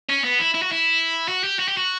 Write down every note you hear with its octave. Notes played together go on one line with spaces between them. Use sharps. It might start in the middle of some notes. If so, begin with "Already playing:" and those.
C#4
B3
E4
E4
F#4
E4
F#4
G4
F#4
G4
F#4